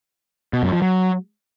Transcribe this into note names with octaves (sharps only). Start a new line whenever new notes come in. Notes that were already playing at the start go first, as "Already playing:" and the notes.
B2
F#2
F3
F#3